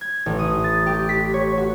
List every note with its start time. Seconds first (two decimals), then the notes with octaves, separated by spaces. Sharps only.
0.01 G#6
0.26 A1
0.39 D#6
0.64 A6
0.86 G4
1.09 B6
1.34 C#5
1.57 F#4